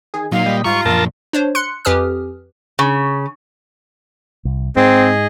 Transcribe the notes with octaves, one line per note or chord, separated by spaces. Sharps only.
D#3 G#4
A#2 F#3 A#3 D#4 F5
G3 D#5 B6
G#2 G3 F4 A#5 C#6
F#2 A#2 F3 A#4 A5
D4 C5 C#5
C6 F#6 C#7
F2 G4 B4 G#5 D#6 F6
C#3
C2
G#2 C4 G#4 D#5